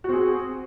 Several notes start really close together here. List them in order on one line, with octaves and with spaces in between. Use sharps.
F#4 C4 G#4